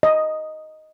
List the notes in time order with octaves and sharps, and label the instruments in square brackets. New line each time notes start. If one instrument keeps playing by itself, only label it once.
[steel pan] D#5